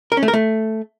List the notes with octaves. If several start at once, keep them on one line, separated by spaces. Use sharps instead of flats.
A#4
C#4
A3
A#4
A3